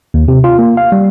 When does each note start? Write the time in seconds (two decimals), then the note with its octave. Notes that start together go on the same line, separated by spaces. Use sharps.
0.14 D#2
0.28 C3
0.44 F4
0.59 A#3
0.77 F5
0.92 G3